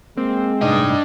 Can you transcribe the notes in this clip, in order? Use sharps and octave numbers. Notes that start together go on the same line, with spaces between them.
G#3 A#3 C4
A2 C3 D4 D#4 D#5 G5